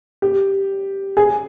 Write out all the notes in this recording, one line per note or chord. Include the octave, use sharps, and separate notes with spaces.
G4
G#4